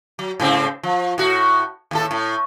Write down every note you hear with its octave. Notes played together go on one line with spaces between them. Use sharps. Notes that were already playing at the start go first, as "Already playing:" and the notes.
F#3
G#2 C#3 C4
F3
A2 F#4
D#2 A2 A4
A2